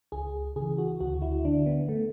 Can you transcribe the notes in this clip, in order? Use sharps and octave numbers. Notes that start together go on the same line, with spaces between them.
C#2 G#4
C#3 E3 G#4
F#4
D2 F#4
E4
D3 D4
B3
A3